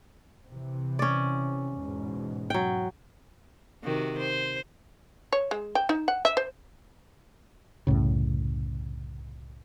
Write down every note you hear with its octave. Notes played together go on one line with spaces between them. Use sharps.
C3 E3
C#4 D5
E2 G#2 B2
F#3 G5
C3 D#3 F#4
C5
C#5
G#3
G5
D#4
F#5
E5
C5
C2 F#2 A2 C#3